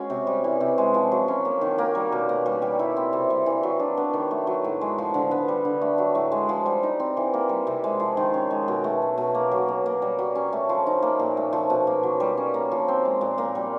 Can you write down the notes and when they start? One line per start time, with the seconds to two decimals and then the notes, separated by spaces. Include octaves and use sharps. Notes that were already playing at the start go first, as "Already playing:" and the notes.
Already playing: G#3 C#4 F#4
0.10 C3
0.27 G3
0.44 E3
0.60 C3
0.78 G#3
0.94 F3
1.11 F#3
1.28 C#4
1.45 A#3
1.61 D#3
1.78 A#3
1.95 G3
2.12 B2
2.29 A#3
2.46 G3
2.62 G3
2.79 E4
2.97 C4
3.13 C3
3.30 G3
3.46 E3
3.63 F#3
3.80 D4
3.97 B3
4.13 D#3
4.31 A3
4.47 F#3
4.64 A2
4.81 G#3
4.98 F3
5.14 D3
5.31 B3
5.48 G3
5.65 D3
5.81 A3
5.98 F#3
6.15 A2
6.32 G#3
6.49 F3
6.66 G3
6.83 D#4
7.00 C4
7.17 E3
7.34 A#3
7.49 G3
7.67 C3
7.84 G#3
8.00 F3
8.17 D#3
8.34 C#4
8.51 G#3
8.68 B2
8.84 A3
9.02 F#3
9.17 B2
9.34 A#3
9.52 F#3
9.68 B2
9.86 A#3
10.02 G3
10.19 F#3
10.35 C#4
10.53 A3
10.69 F3
10.87 D#4
11.02 A#3
11.19 A#2
11.37 A3
11.53 F3
11.70 B2
11.87 A#3
12.03 F#3
12.20 G3
12.37 C#4
12.54 A#3
12.71 F3
12.88 C4
13.05 G#3
13.21 A#2
13.38 A#3
13.55 G3